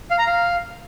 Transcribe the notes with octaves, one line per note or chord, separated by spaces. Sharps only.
F5
A#5
F5